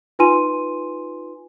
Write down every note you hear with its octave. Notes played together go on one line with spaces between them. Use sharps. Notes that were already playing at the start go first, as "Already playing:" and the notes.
D#4 F4 B4 G#5 C6 D#7